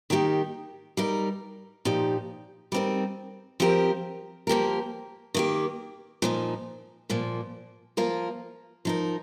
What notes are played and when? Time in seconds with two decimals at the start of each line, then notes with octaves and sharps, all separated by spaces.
0.10 D#3 A#3 D#4 G4
0.97 G3 D#4 A#4
1.85 A#2 F3 D#4 G4
2.72 G3 C4 D#4 A#4
3.60 F3 C4 G4 A#4
4.47 F3 A#3 G4 A#4
5.34 D#3 A#3 G4
6.22 A#2 F3 D#4
7.10 A#2 F3 A#3
7.97 F3 A#3 F4 A#4
8.85 F3 D#4 A#4